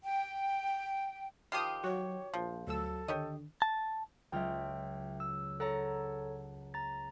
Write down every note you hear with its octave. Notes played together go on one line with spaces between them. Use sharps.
G5
D#3 F3 G4 D#6 C7
F#3 F#4 C#5
A#1 F3
D2 F#3 A4 E6
D3 D#3 G4 C#5 D#5
A5
C#2 F#3 F4 E5 G5
E6
A4 C#5 F#5 A5 A#5
A#5 A6